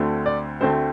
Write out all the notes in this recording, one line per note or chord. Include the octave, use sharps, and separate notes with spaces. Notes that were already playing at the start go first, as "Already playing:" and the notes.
Already playing: D2 D3 A3 C4
D5
D2 D3 A3 C4 C5